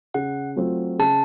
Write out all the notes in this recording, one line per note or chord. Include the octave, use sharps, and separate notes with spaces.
C#3 F#5
F#3 A3 C4 F4
C#3 A5